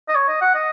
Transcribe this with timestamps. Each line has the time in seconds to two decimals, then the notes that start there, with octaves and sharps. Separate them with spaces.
0.09 D#5
0.15 C#5
0.28 D#5
0.41 F#5
0.55 D#5